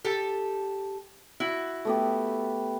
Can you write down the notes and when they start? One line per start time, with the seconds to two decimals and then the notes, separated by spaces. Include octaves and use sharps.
0.05 G4 A4
1.40 E4 F#4
1.85 A3 B3 G4